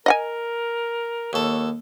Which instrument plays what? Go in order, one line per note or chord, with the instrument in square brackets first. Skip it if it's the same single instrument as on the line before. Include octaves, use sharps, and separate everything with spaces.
[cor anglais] A#4 [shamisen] D#5 F#5 G#5
[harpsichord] D#2 A4 [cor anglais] C#5